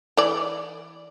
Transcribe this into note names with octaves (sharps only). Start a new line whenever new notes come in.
E3 D5